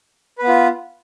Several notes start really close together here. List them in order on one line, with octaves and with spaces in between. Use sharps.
B4 B3 F4